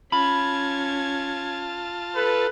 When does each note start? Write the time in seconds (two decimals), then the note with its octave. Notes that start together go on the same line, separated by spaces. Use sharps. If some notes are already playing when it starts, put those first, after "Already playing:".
0.12 C#4 F4 A5 B5 G#6
2.16 A4 B4